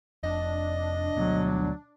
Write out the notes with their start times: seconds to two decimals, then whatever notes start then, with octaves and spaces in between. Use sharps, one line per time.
0.24 F1 D4 D#5
1.17 D2 B2 F#3